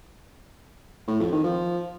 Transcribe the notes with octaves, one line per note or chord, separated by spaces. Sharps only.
A2
F2
D#3
F3